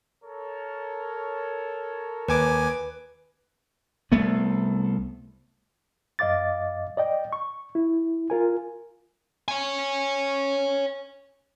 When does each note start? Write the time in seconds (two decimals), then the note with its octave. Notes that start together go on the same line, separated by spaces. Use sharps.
0.24 A4 A#4 C#5
2.28 D#2 B4 G#5 D6
4.12 C2 A3 B3
6.19 F#2 D#5 F5 D6 A6
6.97 D5 D#5 G5
7.33 C#6
7.75 E4
8.30 F4 A#4 G#5
9.48 C#5 G#5